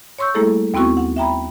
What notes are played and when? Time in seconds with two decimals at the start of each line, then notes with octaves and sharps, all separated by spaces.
0.18 C#5 C6 C#6 E6 G6
0.35 G3 A3 A#3 E4 G#4 A4
0.74 D#2 B3 C4 E4 F#4 C#6
0.97 F#5
1.16 E5 G5 A#5 B5